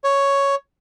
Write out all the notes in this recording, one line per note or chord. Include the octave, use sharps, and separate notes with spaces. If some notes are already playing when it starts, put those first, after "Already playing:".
C#5